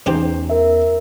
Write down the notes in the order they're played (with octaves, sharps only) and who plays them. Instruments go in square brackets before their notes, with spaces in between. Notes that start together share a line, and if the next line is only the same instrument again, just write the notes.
[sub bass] E2 [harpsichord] G#2 E3 G4 [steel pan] C#4 D#4 C5
[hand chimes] A#4 E5